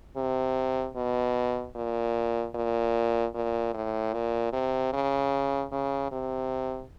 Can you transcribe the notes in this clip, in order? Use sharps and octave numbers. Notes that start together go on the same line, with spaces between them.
C3
B2
A#2
A#2
A#2
A2
A#2
C3
C#3
C#3
C3